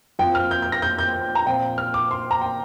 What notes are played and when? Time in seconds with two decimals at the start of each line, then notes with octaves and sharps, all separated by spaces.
0.19 F2 F3 C4 G5
0.35 F6
0.51 G6
0.62 G6
0.72 A#6
0.82 G6
0.98 G6
1.35 A#5
1.46 A#2 F3 C4 G5
1.78 F6
1.94 D6
2.11 C6
2.31 A#5
2.41 G5